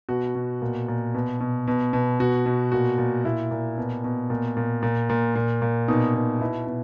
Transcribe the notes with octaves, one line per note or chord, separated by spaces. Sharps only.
B2 F#4
B2
A#2
A#2
B2
B2
B2
B2
B2 F#4
B2
A#2 F#4
A#2
A#2 E4
A#2
B2
B2
A#2
A#2
A#2
A#2
A#2
A#2
B2 D#4
B2
B2 E4
B2